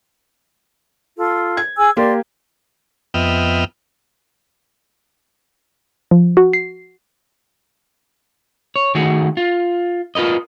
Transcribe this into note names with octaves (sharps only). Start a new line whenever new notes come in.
F4 A4
G#6
G#4 G#5 E6
A#3 G4 A#4 D5 C6
F2 B3 D#5 E5 G5 F6
F3
F#4
C7
C#5
D#3 A3 F#4 G#4
F4
F4 A#4 B4 D#5